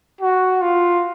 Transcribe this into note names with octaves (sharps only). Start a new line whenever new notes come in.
F#4
F4